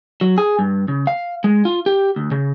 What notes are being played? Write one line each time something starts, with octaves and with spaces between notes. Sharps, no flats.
F#3
G#4
G2
C#3
F5
G#3
F4
G4
D2
C#3